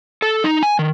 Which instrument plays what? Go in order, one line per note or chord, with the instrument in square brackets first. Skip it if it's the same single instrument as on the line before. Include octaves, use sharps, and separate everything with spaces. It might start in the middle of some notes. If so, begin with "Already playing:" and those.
[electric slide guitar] A4
D#4
G#5
D#3